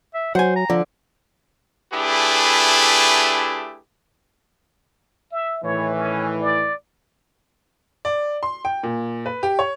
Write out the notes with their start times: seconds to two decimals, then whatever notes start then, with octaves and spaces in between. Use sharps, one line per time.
0.14 E5
0.35 F#3 C5 F#5 G#5
0.56 A#5
0.70 D3 F3
1.93 A3 D4 E4 G4 G#4 B4
5.32 E5
5.64 A2 D#3 E3 C#5
5.95 C#4
6.41 D5
8.05 D5
8.43 C6
8.65 G5
8.83 A#2
9.26 B4
9.43 G4
9.59 C#5